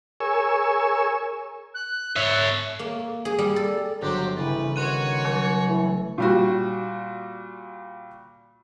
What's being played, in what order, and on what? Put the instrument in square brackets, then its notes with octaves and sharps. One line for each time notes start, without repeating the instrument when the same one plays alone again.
[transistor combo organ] G#4 A#4 C#5 G#5 C#6 E6
[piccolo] F#6
[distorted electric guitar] C#5 E5
[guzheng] A#3
G#4
G3
A4
[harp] G1 A#5 F#6 [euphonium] F#3 [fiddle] G4 C5
[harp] C#3 A6 [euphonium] E3 [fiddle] B4
[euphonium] D#3 [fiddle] F#4 C#5 [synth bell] C6 F#6 D#7
[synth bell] F#3
[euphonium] E3 [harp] A3
[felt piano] A#2 G3 F#4